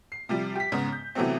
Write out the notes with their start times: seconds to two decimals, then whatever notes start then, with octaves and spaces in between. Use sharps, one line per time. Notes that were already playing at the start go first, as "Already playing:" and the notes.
0.12 C7
0.29 C3 F3 G3
0.55 G4 B6
0.72 G#2 C#3 B3
0.92 G6
1.15 C3 E3 F#3 A3 B3 C4